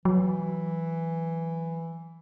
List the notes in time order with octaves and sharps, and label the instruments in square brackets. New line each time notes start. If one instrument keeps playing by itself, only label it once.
[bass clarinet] E3 [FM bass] F#3